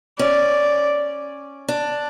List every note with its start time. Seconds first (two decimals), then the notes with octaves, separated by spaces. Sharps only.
0.19 C#4 D5
1.68 D4